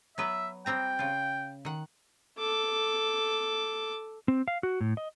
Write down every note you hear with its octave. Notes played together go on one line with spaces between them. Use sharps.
F#3 B3 B4 E5
G3 C4 G5 A#5
C#3 F4
D#3 F#5
A4 D6
C4
F5
F#4
A2
D#5